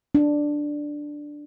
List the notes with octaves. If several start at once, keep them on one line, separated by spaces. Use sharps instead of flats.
D4